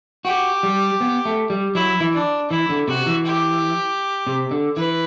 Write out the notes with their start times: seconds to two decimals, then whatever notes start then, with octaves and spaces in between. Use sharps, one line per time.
0.25 F#4 G4
0.63 G3
1.01 B3
1.25 A3
1.50 G3
1.75 F#3 E4
2.00 E3
2.14 D4
2.51 E3 E4
2.69 D3
2.88 C3 F#4
3.06 E3
3.26 G4
4.27 C3
4.51 D3
4.76 E3 B4